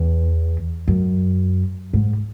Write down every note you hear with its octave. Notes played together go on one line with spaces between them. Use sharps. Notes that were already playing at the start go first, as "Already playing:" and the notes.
Already playing: E2
F#2
G#2